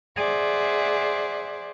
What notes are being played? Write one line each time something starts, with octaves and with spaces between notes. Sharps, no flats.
G#4 C5 D5 E5 F#5